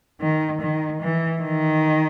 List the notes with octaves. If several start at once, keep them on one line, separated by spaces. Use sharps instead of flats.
D#3
D#3
E3
D#3